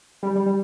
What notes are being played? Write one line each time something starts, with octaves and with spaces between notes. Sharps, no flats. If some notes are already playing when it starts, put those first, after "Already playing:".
G3
G3
G3